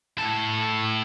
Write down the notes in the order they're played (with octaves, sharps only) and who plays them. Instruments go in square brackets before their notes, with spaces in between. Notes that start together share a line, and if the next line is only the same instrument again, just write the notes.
[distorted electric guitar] A2 A4